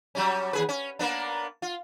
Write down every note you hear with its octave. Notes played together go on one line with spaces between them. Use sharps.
F#3 G3 C#4
D#2 G#4 B4
C#4
A#3 B3 D4
F4